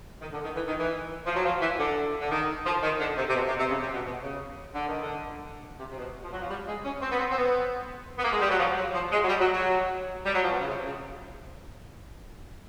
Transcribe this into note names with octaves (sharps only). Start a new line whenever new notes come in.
D#3
D3
D#3
E3
D#3
E3
F3
F#3
F3
E3
D3
D3
D#3
F3
D#3
D3
C3
C3
B2
C3
C3
C#3
C3
B2
B2
C#3
D3
D#3
D3
C3
C3
B2
F3
F#3
F3
G3
G#3
C#4
C4
B3
C4
C4
B3
B3
A#3
G#3
G3
F#3
F3
F#3
F3
G#3
F#3
G3
F#3
F#3
G3
F#3
F3
B2
C#3
C3
C#3